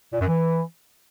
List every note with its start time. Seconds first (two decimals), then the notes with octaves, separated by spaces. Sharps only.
0.12 A#2
0.20 F#2
0.27 E3